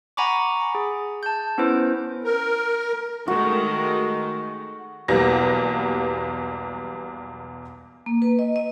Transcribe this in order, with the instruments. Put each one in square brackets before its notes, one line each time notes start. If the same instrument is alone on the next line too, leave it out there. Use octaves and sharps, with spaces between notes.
[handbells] F#5 G#5 A#5 B5 C#6 D6
G#4
A5 G6
B3 C#4 E4 B4 C5
[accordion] A#4
[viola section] D#3 G#3 A3 [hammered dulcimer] F#4
[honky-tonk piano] B1 E2 B2 G3 A#3 A#6
[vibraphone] A#3
B4
D#5
D#5